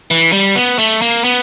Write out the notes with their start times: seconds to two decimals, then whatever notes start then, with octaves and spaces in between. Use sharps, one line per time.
0.11 E3
0.32 G3
0.56 B3
0.79 A3
1.02 A#3
1.24 B3